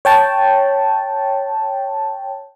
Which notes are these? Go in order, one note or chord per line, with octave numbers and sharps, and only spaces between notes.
C#5 G5 A5